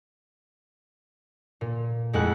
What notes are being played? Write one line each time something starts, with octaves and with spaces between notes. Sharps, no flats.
A#2
F2 G#3 A3 E4 F#5 F#6